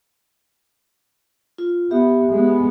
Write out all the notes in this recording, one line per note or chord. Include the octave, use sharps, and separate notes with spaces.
F4
B3 G4 E5
G#3 B3